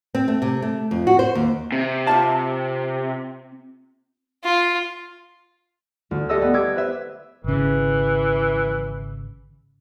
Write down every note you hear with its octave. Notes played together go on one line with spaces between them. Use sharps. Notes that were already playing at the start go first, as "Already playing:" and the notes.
C4
A3
C3
A3
F2
F#4
C5
D#2
C3
C4 F4 A5
F4
D2
G4 A4 D#5 E5 E6
B3
G4 D6 E6 G#6
B4 C5 E5
G#1 C#3 E3